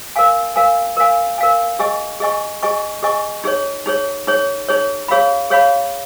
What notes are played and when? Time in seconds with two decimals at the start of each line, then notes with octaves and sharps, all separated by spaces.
0.16 A#4 F5 G#5
0.56 A#4 F5 G#5
0.97 A#4 F5 G#5
1.38 A#4 F5 G#5
1.79 G#4 D#5 G#5 C#6
2.20 G#4 D#5 G#5 C#6
2.63 G#4 D#5 G#5 C#6
3.03 G#4 D#5 G#5 C#6
3.44 D#4 G#4 C#5
3.86 D#4 G#4 C#5
4.27 D#4 G#4 C#5
4.68 D#4 G#4 C#5
5.08 G#4 C#5 F5 B5
5.50 G#4 C#5 F5 B5